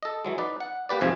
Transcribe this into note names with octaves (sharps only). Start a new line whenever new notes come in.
A4 D#5
E3 F#3 G#3
D#4 B4 D5
F#5
A#3 G4 B4 D5
F2 G#2 C3 F3 F4 G#5